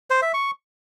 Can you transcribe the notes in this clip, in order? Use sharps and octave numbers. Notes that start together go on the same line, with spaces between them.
C5
E5
C#6